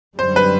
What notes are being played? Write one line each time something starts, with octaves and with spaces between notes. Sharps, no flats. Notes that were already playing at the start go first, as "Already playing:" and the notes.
F#2 D3 G3 C5
B4